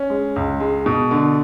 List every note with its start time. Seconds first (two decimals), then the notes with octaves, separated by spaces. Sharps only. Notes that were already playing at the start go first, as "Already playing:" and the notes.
Already playing: C#4
0.10 G#3
0.36 C#2
0.60 G#3
0.86 B2
1.11 D3